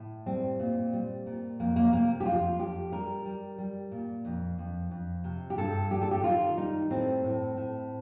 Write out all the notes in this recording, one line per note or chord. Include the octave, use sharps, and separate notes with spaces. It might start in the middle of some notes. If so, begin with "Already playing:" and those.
Already playing: A2
G3 C4
A#2
G3
A#2
F2 A#3
A#3
C3 A#3
G4
F2 F4
F2 G4
G3 A#4
G3
G3
A#2
F2
F2
F2
C3
G4
G2 A4
G3 G4
A4
G4
D#3 F4
G3 D#4
A2 C4
A2
A2